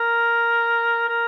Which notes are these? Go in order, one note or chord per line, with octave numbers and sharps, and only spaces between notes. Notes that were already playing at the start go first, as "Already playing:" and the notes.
Already playing: A#4
A#4